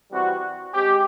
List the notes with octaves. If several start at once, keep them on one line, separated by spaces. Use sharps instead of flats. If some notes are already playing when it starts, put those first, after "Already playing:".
E3 G3 C4 F#4
G#3 C4 G4